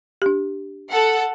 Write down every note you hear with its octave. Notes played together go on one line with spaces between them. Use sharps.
D4 G4
A4 F#5